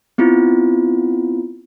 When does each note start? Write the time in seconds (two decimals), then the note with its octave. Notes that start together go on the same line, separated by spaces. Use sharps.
0.18 B3 C4 E4 F4